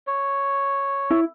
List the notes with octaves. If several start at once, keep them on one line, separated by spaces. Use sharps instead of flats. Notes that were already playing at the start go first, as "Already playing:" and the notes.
C#5
E4